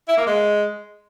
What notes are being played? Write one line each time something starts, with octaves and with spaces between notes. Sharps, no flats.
E4
A#3
G#3